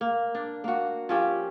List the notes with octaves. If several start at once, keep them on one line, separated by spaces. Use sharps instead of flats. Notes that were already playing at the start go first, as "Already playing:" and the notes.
A#3
D4
A#3 F#4
F3 C#4 G4